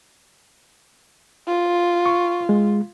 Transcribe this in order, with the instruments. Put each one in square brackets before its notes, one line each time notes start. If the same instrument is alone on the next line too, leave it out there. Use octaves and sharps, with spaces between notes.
[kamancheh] F4
[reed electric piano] C#6
G#3